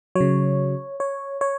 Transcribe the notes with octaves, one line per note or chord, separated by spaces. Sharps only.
C#3 F#3 C#5
C#5
C#5